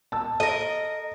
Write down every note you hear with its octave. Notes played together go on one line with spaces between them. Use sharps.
A5 E6
A4 A#4 D#5